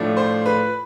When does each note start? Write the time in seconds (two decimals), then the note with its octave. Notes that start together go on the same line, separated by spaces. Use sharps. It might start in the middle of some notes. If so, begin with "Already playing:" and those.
Already playing: A2 F3 A3 D4
0.17 C5 C6
0.46 B4 B5